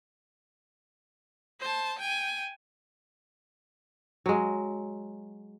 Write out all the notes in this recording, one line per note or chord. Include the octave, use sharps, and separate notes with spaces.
C5 A5
G5 G#5
F#3 G#3